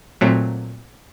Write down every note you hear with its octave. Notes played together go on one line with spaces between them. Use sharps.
A#2 F#3 A3 C4